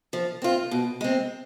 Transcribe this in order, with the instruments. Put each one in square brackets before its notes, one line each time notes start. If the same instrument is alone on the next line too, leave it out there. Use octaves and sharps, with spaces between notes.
[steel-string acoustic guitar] F3
C4 F4
B2
G#3 C4